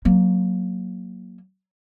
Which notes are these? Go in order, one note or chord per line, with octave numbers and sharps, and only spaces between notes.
F#3 A#3